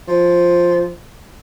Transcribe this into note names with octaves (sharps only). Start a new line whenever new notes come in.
F3